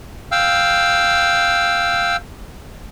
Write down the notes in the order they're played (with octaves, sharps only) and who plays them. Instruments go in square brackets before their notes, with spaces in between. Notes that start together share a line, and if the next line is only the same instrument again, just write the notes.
[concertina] F5 G5 E6